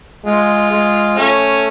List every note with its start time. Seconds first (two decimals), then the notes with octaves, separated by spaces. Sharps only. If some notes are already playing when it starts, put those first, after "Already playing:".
0.25 G#3 F4
0.71 G#3
1.17 A3 C#4